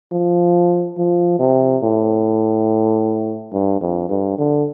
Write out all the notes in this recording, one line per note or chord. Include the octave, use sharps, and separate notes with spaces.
F3
F3
C3
A2
G2
F2
G2
D3